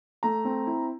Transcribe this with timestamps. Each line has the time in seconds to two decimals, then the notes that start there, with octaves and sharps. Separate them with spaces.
0.23 A3 A#5
0.45 C4
0.67 E4